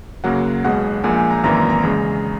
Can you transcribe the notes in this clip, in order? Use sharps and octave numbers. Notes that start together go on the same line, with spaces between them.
F#2 C#3 F#3 A#3 F#5
B1 B2 G#3 F#5
A#1 A#2 G#3 G#5
G#5
A#5
G#1 F#2 E3 A#3 A#5
A#5
A#5
E2 C#3 G#3